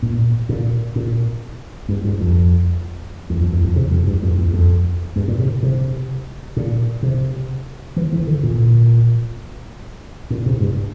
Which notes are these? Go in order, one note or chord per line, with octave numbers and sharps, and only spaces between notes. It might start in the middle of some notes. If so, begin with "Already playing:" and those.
A#2
A#2
A#2
G2
G2
F2
E2
F2
E2
F2
C3
F2
G2
F2
E2
F2
G2
A#2
C3
C3
A#2
C3
E3
E3
D3
A#2
A#2
C3
G2